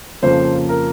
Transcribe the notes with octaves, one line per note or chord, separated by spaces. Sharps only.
F2 C#3 F3 A#3 C5
A#4